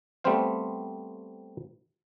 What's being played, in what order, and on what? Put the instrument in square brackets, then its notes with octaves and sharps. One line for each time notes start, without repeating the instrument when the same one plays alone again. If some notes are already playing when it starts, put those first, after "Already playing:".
[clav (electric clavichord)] G3 A3 B3 C4 C5 F5